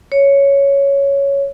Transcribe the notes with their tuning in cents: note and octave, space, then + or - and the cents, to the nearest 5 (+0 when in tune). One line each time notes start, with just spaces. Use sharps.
C#5 +5